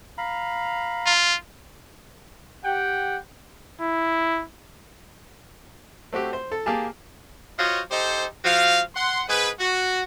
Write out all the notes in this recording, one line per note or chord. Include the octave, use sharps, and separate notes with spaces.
F5 A#5 B5
F4
G4 F#5 G5
E4
A3 C4 F#4 G4
C5
A4
A#3 G4 G#4 A5
F4 F#4 C5 C#5 D#5
D#4 G4 A4 C5
F3 F#4 F5
F#5 C6
G#2 G#4 B4
F#4